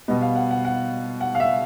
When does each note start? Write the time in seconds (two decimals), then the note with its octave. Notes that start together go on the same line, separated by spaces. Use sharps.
0.08 B2 G3 B3 D#5
0.21 F5
0.36 F#5
0.51 F#5
0.65 F#5
1.21 F#5
1.35 F5
1.40 E5